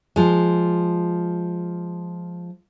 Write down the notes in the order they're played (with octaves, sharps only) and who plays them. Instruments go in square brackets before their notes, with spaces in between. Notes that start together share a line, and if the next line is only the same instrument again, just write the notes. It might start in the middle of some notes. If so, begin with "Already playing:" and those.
[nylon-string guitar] F3 G#3